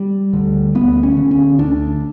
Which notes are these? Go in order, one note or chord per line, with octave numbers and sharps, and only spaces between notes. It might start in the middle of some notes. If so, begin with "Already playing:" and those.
Already playing: G3
D2 D3
D2 B3
C#4
D3
C#4
D2 D4